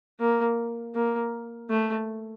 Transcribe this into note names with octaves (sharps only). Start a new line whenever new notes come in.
A#3
A#3
A3